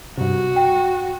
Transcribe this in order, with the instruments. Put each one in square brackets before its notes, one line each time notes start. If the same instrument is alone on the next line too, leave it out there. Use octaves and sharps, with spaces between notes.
[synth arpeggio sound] G2 C3 [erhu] F#4
[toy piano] G5